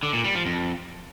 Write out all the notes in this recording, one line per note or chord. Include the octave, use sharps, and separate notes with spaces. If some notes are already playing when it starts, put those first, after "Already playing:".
D3
A#2
G3
F3
F2